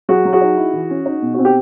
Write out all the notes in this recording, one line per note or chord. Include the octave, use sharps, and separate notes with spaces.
F#3 F#4 G#4
F#3
F#4 G#4
D#4
E4
E3
C#4
D#4
B2
C4 F#4
G4